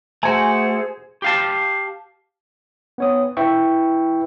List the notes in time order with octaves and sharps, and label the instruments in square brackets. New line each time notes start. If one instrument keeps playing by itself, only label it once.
[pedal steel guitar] A3 F#4 [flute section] G#4 C5 [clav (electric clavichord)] G#5
[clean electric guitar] G4 F5 A5
[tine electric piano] B3 C#5 D#6
E4 B4 E5 G5 C#6